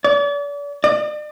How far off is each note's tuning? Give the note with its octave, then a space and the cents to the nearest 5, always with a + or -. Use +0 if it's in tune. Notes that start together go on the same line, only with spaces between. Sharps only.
D5 -40
D5 +40